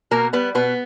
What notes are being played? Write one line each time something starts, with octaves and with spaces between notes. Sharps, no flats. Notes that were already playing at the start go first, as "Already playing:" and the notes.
B2 A#3 A#4
G3 B3 B4
B2 B3 B4